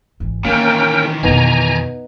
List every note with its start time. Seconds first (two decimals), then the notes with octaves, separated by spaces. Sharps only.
0.20 G#1 E3
0.45 D#3 E3 A#3 B3 C#4 A#4 G5
1.23 F2 B2 B3 D#4 G#5 A#5